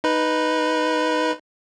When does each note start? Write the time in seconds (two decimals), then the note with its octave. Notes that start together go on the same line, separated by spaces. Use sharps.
0.04 D#4 B4